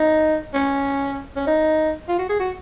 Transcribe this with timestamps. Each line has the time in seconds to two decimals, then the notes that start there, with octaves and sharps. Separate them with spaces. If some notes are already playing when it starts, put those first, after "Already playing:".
Already playing: D#4
0.54 C#4
1.36 C#4
1.47 D#4
2.08 F4
2.19 F#4
2.29 G#4
2.39 F#4